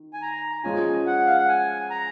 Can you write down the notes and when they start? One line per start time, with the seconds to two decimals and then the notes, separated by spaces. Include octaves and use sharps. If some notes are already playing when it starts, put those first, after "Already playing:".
Already playing: D#3
0.14 G#5
0.22 A#5
0.63 F3 G#3 C#4 F4 G#5
1.07 F#5
1.26 F5
1.38 F#5
1.49 G#5
1.91 A#5